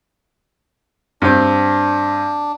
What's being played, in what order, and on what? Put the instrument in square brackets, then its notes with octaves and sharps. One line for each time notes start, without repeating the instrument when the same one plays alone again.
[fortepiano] G2 C4 [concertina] D4